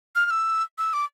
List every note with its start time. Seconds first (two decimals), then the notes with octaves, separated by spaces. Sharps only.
0.16 F6
0.26 F6
0.31 E6
0.78 E6
0.93 D6